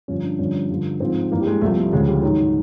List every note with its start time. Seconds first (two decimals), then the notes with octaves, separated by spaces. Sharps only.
0.08 G2 D3 F3 C#4
0.23 D4
0.39 G2 D3 F3 C#4
0.70 G2 D3 F3
1.00 G#2 F3 C4
1.32 G2 E3 A#3
1.41 G3
1.47 G#3
1.61 C2 C3 F3 A3
1.77 A3
1.92 D2 C#3 F3 G#3
2.08 G3
2.23 G#2 D#3 F#3